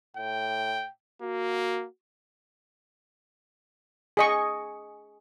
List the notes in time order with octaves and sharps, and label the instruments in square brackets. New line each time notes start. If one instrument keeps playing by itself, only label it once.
[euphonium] A2 [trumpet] G5
[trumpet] A#3 [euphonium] F#4
[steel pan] G#4 D#5 C#6